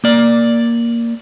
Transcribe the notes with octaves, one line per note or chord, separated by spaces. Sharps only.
A#3 D5